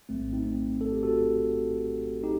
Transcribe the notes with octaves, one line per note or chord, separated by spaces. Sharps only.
A#1 A2 F#3 A3 C4
C4 D#4
A4
G4
F#4 A4
D#4 G4